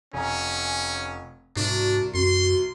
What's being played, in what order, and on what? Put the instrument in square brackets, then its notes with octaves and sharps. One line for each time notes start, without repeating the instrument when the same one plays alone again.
[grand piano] F1 A#5 [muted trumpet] C#4 [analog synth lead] G#5
[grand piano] C2 [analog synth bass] G#2 [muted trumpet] D4 [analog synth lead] F#4
[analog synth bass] F#2 [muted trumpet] C6